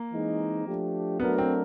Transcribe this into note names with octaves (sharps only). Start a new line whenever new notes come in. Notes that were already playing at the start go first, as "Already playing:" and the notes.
Already playing: A#3
E3 G#3 C4 D#4
F3 A3 D4 G4
F#3 A3 B3 D4 F#4 A#4
C4